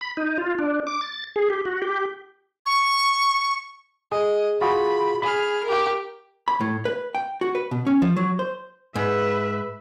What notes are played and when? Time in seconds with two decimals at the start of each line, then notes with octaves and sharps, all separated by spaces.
0.01 B5
0.17 D#4
0.38 F4
0.59 D4
0.87 D6
1.01 A6
1.36 G#4
1.50 G4
1.65 F#4
1.82 G4
2.66 C#6
4.12 G#4 D#5
4.61 F4 F#4 G#4 B5
5.22 G#4 B5 F6
5.64 G4 A#4
6.48 B5
6.61 A2
6.85 B4
7.15 G5
7.41 F#4
7.55 B4
7.71 B2
7.87 C#4
8.02 F3
8.17 F#3
8.39 C5
8.96 G#2 B4 E5